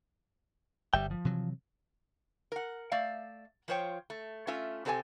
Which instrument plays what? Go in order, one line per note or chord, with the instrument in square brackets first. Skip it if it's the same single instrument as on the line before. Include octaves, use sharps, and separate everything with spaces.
[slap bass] G1 [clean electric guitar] G3 E5 G5
[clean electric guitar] F3
[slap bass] C3 E3 F#3
[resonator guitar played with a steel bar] A#4 F#5
A3 D5 E5 F5
F3 F4 C5 C#5 G5
A3
A3 C#4 F4 E5
C3 C4 G4 A4 D5 G#5